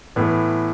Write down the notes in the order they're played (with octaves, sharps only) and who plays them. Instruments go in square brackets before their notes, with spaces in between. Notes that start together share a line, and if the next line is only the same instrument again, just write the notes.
[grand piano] A2 E3 B3